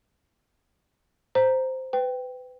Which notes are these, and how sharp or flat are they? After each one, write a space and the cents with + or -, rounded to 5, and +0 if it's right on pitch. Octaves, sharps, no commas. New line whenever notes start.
C5 -5 A#5 +0
B4 +30 G5 +0